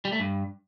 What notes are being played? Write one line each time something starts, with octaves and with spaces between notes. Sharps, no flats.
G3
A3
G2